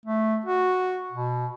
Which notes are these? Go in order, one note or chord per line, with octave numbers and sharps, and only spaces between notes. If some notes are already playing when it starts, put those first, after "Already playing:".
A3
F#4
B2